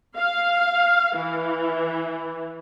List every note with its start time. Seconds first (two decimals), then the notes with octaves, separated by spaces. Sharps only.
0.17 F5
1.17 E3